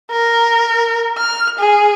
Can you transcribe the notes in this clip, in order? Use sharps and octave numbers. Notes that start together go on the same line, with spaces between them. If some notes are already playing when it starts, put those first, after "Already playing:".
A#4
F6
G#4